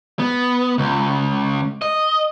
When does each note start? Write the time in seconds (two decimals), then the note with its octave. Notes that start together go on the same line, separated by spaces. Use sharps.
0.19 B3
0.78 C#2
1.82 D#5